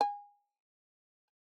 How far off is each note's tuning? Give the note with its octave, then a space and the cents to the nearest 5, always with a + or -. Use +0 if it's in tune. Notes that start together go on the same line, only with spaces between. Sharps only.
G#5 -25